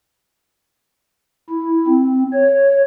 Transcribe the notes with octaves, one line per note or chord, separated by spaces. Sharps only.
E4
C4
C#5